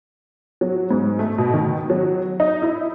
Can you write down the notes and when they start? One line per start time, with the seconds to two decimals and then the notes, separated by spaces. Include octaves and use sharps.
0.61 F#3
0.91 G#2
1.19 A3
1.38 B2
1.54 D#3
1.90 F#3
2.40 D#4
2.62 E4